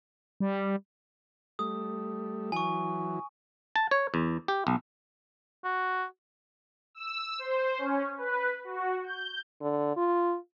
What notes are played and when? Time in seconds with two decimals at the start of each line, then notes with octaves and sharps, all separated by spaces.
0.40 G3
1.59 G3 A3 D#6
2.52 E3 F#3 G#5 C#6
3.76 A5
3.91 C#5
4.14 E2
4.48 G4
4.67 B1
5.64 F#4
6.95 E6
7.39 C5
7.78 C#4
8.18 B4
8.64 F#4
9.04 G6
9.61 D3
9.97 F4